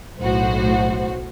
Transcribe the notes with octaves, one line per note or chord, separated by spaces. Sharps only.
B1 A2 F#4 C5